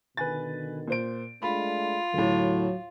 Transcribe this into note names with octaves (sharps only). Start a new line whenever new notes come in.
B2 D3 D#3 B4 G#5 A6
A#2 C5 D7
G#3 A3 D4 F4 B5
D2 A2 F#3